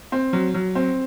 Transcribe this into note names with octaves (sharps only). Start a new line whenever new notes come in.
C4
F#3
F#3
C4